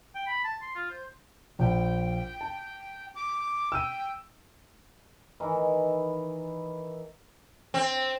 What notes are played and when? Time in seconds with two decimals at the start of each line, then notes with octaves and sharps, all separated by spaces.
0.15 G5
0.27 B5
0.44 A5
0.62 C6
0.75 F4
0.90 C5
1.59 A#1 G5
2.41 A5
3.15 D6
3.72 G5 E6 D#7
5.40 D#3 E3
7.74 C4